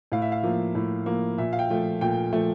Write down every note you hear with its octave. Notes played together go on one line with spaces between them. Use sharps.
A2 F5
E5
F5
F3 A#3
A2
F3 A#3
A#2 E5
F5
G5
F3 A3
A#2 G5
F3 A3